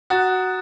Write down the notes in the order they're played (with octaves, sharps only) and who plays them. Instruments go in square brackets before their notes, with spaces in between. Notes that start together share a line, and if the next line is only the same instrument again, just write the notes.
[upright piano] F#4 [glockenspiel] A#5 D#6 F#6 A6